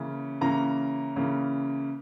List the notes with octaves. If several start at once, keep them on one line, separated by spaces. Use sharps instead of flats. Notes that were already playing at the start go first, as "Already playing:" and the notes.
Already playing: C#3 E3 A#3 C#4
C#3 E3 A#3 C#4 A#5
C#3 E3 A#3 C#4